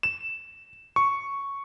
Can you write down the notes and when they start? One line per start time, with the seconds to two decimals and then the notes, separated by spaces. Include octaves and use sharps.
0.03 E7
0.96 C#6